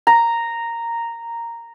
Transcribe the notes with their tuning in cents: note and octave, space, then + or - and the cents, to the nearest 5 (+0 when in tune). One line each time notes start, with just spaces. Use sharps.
A#5 -5